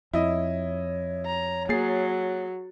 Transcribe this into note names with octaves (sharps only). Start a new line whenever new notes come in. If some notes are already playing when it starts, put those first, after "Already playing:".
F2 E4 C#5 D#5
A#5
F#3 A#3 G#4 A6 C7